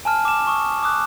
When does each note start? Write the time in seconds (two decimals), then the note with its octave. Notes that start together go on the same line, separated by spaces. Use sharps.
0.05 G#5 A5 F6
0.25 D6 E7
0.47 C#6 D#6
0.83 D6 D#6 F#6